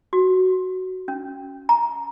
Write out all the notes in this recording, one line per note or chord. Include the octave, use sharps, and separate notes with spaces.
F#4
C#4
A#5